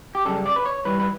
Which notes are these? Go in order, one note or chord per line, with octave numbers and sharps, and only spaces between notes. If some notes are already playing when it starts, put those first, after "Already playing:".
G4
F#2 C#3 G3 A4
D5
B4
C#5
G2 E3 G3 B4
B4